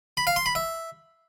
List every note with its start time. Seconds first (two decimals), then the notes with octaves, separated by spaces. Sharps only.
0.17 B5
0.27 F5
0.36 C6
0.46 B5
0.55 E5